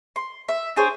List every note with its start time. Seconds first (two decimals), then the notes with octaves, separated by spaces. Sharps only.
0.16 C6
0.49 E5
0.76 D4 G#4 C5 C#5